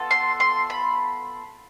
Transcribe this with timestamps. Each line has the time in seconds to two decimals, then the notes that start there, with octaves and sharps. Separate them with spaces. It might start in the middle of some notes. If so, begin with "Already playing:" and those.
Already playing: B3 F4 A4
0.11 C6
0.40 C6
0.70 B5